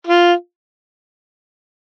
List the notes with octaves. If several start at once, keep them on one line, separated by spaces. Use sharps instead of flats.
F4